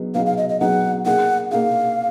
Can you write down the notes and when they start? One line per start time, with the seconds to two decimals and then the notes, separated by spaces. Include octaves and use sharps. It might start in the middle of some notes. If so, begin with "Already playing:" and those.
Already playing: F#3 B3 D#4 G#4
0.15 F#3 B3 D#4 G#4 F5
0.26 F5
0.37 D#5
0.49 D#5
0.60 F#3 B3 D#4 G#4 F#5
1.05 A#3 D#4 G#4 F#5
1.51 A#3 D#4 G#4 F5